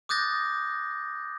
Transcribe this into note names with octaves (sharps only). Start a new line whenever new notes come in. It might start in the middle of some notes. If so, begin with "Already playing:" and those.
D6 D#6 F#6 G6 A6 A#6